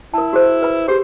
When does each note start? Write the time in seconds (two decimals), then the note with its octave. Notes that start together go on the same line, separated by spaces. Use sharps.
0.14 E4 A#4 A5
0.33 F#4 G#4 C5
0.63 B4 B5
0.88 G4 G#4 C5 C6